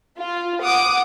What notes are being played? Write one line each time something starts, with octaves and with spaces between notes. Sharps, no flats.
F4
F#5 D6 D#6